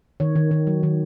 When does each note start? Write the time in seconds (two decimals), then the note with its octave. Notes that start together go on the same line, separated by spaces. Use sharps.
0.20 D#3 C#5
0.36 D#3
0.51 D#3
0.67 F#3
0.83 D#3